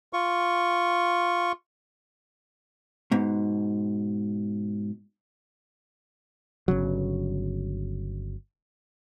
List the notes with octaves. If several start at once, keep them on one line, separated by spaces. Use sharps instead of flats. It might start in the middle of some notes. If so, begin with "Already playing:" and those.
F4 C#6
G#2 B2
G1 C#3 F#3